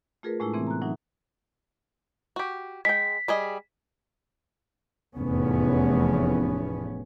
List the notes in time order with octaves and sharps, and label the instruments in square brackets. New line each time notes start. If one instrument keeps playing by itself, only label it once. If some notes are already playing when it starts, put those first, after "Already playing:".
[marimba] A3 F4 G#4 A#4 B4
A2 G#3 A3 D4 E4
C3 E3 A3 B3 C4
A#5 F#6
A2 E3 F#3 D#4 E5
[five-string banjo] F#4 G4
[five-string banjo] G#3 G5 [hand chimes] B6
[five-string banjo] G3 G#4 D#5
[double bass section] F1 E2 A2 B3 C#4